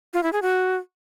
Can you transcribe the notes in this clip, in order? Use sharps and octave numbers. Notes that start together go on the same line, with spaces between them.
F4
E4
G#4
F#4